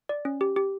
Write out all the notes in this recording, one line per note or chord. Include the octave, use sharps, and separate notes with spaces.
D5
C#4
G4
G4